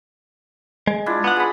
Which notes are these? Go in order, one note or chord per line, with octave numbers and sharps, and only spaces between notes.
G#3
D4 E4 F4
B3 F#5
G#3 B5